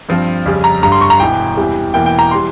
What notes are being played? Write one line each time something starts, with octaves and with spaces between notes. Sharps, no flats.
G2 F3 C4
F2 C#3 G3
A#5
G1 G2 G3 A#5
C6
C#6
A#5
E1 E2 E3 G5
E2 C3 E3 G3
E1 E2 E3 A#3 G5
G5
A#5
E3 G3 C6